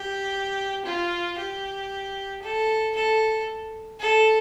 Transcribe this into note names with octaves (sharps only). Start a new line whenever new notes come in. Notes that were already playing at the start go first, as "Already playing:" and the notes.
Already playing: G4
F4
G4
A4
A4
A4